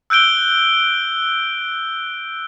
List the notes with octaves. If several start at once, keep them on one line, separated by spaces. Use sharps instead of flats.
E6 F#6 G6 D7 G7